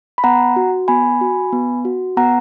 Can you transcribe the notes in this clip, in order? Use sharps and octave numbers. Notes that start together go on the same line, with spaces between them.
B5
B3 F#5 A#5
F#4
B3 G#5 B5
F#4
B3
F#4
B3 F#5 A#5